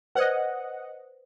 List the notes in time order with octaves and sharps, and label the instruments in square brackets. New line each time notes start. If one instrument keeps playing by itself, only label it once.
[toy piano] B4 C5 D5 [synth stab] D#5 F#5